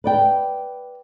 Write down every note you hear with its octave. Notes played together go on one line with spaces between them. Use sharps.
B4 D5 G5